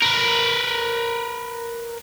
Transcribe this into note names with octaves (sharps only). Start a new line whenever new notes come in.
A#4 B4